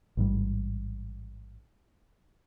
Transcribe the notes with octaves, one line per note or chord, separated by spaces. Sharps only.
A1 G#2 G3